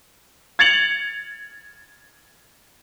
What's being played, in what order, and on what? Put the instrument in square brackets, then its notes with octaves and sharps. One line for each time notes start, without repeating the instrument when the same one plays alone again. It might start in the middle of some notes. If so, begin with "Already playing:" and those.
[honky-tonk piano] G#6 A6 C#7 F7 F#7